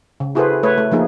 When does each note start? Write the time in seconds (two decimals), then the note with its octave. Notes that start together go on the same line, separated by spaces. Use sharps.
0.20 C#3
0.35 E4 F#4 G#4 A4 B4 C5
0.63 A3 B4 C#5
0.78 A3
0.92 F3 A#3 D#4 G#4